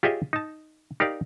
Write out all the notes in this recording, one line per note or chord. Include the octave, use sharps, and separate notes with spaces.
F4 G4 G#4 C#5 D#5 E5
D#4 A5
D#4 G4 A#4 D5 F5